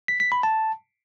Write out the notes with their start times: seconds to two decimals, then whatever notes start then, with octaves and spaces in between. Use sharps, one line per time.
0.08 B6
0.20 B6
0.32 B5
0.43 A5